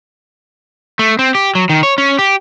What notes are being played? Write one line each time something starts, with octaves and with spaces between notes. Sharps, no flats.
A3
C4
G4
F#3
D#3
C#5
C#4
G4